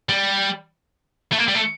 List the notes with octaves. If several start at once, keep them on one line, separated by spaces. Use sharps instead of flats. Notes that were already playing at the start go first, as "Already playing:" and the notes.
G3
A3
A#3
G3
A3